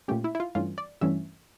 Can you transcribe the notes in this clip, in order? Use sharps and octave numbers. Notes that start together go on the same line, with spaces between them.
A#2 A3 C#4 G4
E4
E4
F4
G2 E3 A3 C#4 F4
D5
G2 E3 A3 C#4 E5